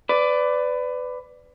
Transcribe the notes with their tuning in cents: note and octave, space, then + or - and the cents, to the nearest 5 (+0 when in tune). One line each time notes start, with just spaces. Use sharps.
B4 +25 D5 +0